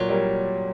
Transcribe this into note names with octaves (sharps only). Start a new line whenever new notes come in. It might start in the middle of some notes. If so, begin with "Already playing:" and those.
Already playing: A#2 F#3
G3 A#3